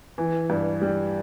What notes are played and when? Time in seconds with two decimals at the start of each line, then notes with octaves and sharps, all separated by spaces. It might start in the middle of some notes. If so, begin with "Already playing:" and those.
0.18 E3
0.50 G2
0.82 G3